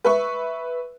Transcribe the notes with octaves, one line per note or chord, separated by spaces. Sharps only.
B4 E5 C#6